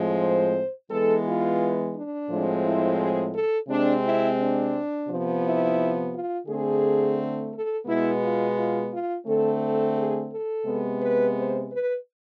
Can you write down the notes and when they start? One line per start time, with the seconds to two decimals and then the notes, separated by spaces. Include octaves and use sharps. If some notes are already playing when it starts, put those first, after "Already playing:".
Already playing: A2 F3 G#3 C4
0.20 C5
0.89 E3 G#3 B3 A4
1.25 F4
1.94 D4
2.29 A2 F3 G#3 C4
2.64 E4
2.98 G#4
3.34 A4
3.68 C3 G#3 C4 D4
4.04 E4
4.38 D4
5.07 C3 F3 B3
5.42 E4
6.12 F4
6.46 D3 A3 C4 G#4
7.52 A4
7.86 B2 G#3 B3 E4
8.21 F4
8.56 F4
8.91 F4
9.25 D3 A3 C4 A4
9.60 A4
9.95 G#4
10.30 A4
10.65 C3 G#3 B3
11.00 B4
11.34 C5
11.70 B4